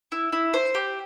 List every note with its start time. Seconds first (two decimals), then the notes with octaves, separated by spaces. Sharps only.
0.12 E4
0.32 E4
0.54 C5
0.75 G4